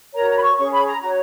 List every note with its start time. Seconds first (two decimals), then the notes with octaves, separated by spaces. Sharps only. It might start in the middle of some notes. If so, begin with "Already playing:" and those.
0.14 F#4 A#4 C#5 A#5
0.29 A#5
0.37 B5
0.43 C#6
0.58 C#4 G#4 C#5 C#6
0.72 B5
0.86 A#5
1.01 F#4 C#5 A#5